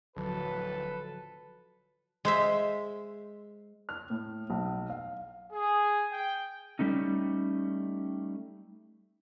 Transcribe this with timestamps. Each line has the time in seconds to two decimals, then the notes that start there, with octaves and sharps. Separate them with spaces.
0.16 D1 D3 F3 F#3 A4 B4
2.25 G#3 C5 E5
3.89 F6
4.10 A2
4.50 B1
4.90 F5
5.52 G#4
6.12 G5
6.79 G3 A3 C#4 D#4